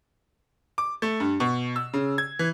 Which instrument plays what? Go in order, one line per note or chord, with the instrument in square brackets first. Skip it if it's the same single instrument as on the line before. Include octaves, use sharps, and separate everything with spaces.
[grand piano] D6
A3
G2
B2
E6
C#3
G#6
E3